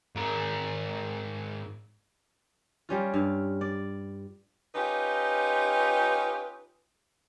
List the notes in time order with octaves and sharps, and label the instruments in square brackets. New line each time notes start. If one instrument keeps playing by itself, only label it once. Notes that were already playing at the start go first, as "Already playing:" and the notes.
[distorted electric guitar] G#2 A#4
[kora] G3 C#4 F4
G2 F5
D5
[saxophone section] C#4 D#4 F4 G4 B4